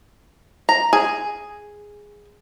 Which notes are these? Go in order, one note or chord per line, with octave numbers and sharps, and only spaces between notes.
A#5
G#4